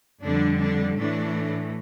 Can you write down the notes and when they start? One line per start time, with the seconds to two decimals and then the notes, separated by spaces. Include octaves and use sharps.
0.22 F2 D3 G3 D4
0.60 D4
0.97 A2 E3 A3 D4